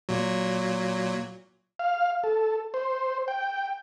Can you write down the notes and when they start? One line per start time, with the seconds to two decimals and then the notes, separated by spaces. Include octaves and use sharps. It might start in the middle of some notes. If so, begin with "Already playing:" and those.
0.09 A#2 F#3
1.79 F5
2.23 A4
2.74 C5
3.28 G5